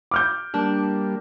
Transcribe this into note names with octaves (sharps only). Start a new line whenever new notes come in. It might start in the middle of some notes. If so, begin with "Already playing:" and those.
D6 F6 G6
G3 A#3 D4